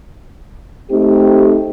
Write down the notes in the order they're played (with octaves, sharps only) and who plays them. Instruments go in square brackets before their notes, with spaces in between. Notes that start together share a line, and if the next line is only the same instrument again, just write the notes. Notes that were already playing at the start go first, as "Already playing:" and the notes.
[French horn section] A3 C4 D#4 G4